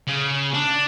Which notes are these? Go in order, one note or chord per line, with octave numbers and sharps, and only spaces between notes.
C#3
D4